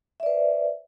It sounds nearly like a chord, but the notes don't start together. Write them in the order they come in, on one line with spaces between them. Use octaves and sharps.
E5 D5 B4 C5